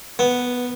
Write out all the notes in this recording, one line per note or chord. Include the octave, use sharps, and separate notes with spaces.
B3